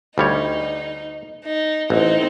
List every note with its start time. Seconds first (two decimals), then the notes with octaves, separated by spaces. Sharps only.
0.18 D2 G3 D#4 C#5
1.45 D#4
1.90 A1 C4 D#4